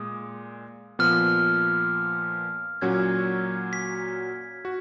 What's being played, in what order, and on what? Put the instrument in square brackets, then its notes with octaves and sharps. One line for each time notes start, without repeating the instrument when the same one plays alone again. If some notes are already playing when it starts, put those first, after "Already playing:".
Already playing: [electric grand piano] A#2 G#3 [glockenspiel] D#6
[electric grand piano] A#2 F3 B3 [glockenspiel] F6
[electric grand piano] A#2 F#3 C#4 F#4 [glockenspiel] G#6
[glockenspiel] B6
[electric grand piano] F#4